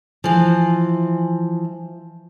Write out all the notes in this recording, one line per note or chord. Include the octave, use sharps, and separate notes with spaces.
E3 F3